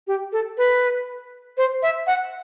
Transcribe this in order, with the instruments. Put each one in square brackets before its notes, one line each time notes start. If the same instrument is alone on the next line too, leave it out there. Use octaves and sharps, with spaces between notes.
[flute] G4
A4
B4
C5
E5
F#5